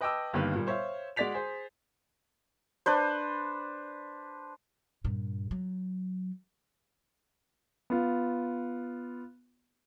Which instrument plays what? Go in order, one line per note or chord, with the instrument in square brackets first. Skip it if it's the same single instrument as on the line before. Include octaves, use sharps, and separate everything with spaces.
[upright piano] B4 D#5 G5 A5 D6 E6
G1 G2 D#3 A#3 G4 B4
A#2 G3
C5 C#5 E5 F5
G#3 F#4 D5 A6 B6 F7
G#4 C5
[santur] D4 B4 C5
[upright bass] G2 A#2
F#3
[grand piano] B3 F4